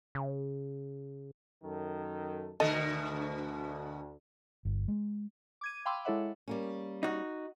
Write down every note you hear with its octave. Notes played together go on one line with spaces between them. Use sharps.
C#3
F#2 D#3 A4
D2 B2 D3 A4 A#4 D#5
G1
G#3
D6 G#6 D#7
F5 G5 B5 C6 D6 E6
G#3 E4 A4 C#5 E5 F#5
G3 A#3 C#4
D#4 F#4